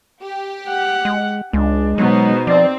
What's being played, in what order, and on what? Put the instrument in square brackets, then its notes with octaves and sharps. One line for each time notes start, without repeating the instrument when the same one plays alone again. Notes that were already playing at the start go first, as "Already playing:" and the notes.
[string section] G4
[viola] F#5
[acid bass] G#3
[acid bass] C#2 [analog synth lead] G#3 [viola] D4
[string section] B2 B3 [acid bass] F#3 [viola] D#4 C5
[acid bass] F3 [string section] C4 [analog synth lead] D5